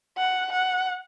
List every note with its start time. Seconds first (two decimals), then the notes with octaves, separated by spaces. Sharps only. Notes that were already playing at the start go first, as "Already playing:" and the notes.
0.17 F#5
0.52 F#5